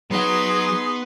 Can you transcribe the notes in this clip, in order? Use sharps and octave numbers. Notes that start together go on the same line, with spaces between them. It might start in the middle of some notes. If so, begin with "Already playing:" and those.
F#3 B3 D#4 G#4 F#5 C6